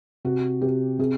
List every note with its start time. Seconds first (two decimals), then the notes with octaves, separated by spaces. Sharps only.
0.25 C3 F#4
0.61 C3 G4
0.99 C3 G#4